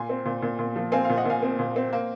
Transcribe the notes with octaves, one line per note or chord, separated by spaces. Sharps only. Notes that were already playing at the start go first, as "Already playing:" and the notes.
Already playing: A#2 G#5 C6
C4
A#2
A#2
A#2
F3
C4 F5 G#5
F5
A#2
D#5 F#5
A#2 F5 G#5
C4
A#2
C4
A#3